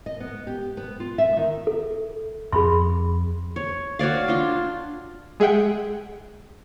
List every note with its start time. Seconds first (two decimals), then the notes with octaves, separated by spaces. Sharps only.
0.06 D#5
0.20 B3
0.47 G4
0.77 B3
1.00 F4
1.18 E5
1.37 D#3
1.67 A4
2.53 F2 C4 G#4 B5 C6
3.56 C#5
3.99 F#4 C#5 D5 F5
4.28 D4 F4
5.40 G#3 G#4 E5 F#5 G5